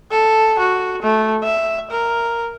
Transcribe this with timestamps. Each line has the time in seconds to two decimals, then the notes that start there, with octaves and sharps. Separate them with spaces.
0.11 A4
0.59 F#4
1.02 A3
1.43 E5
1.91 A#4